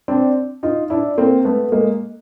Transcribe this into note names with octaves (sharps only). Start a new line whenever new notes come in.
C4 D4
D#4 F4
D4 E4
A#3 C4
A3 B3
G#3 A#3